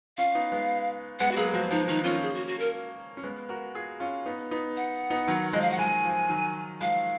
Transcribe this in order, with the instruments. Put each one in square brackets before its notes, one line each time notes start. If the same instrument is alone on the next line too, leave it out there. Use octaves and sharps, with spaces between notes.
[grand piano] C#4 F4 [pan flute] F5
[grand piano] B3 D#4
G#3 B3
[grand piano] G#3 B3 [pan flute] F#5
[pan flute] F#4
[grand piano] F#3 A#3 [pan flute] G#4
[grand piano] F3 G#3 [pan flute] F#4
[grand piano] F3 [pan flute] D#4
[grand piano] D#3 [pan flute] D#4
[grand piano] A#3 C#4 [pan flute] F4
[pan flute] G#4
F#4
F#4
A#4
[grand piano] C#4
G#3 B3
F#4 A#4
F4 G#4
C#4 F4
B3 D#4
B3 D#4
[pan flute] F#5
[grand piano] B3 D#4
D#3 F#3
[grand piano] F3 G#3 [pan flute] D#5
[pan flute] F5
F#5
[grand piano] F3 G#3 [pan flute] G#5
[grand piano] F3
D#3 F#3
[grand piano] F3 G#3 [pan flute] F5